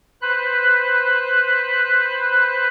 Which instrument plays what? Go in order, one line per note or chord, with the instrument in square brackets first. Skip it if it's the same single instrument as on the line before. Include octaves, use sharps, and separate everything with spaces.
[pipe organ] B4 C5 B5 F#6